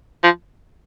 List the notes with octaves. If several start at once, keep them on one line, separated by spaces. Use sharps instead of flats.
F3